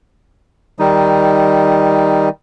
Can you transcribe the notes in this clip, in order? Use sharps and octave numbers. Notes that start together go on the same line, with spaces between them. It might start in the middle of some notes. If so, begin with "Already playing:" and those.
D#3 G3 D#4